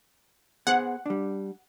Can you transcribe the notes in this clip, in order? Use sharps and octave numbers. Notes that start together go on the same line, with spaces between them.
B3 G#4 C5 F#5
G3 D4